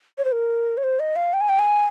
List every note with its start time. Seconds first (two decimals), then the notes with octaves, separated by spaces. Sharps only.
0.18 C#5
0.25 C5
0.32 A#4
0.77 C#5
0.83 C5
0.99 D#5
1.16 F5
1.33 G5
1.41 G#5
1.49 G5
1.59 G#5